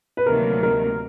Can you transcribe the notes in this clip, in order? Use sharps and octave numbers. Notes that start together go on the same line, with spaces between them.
B4
D2 C3 D#3 F#3 A#3 A#4
A#4